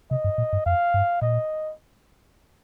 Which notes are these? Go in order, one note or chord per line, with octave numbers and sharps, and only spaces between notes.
C3 D#5
G2
A#2
G2
F2 F5
G2
A#2 D#5